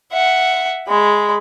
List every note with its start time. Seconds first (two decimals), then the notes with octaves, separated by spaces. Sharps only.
0.12 E5 F#5
0.88 G#3 B5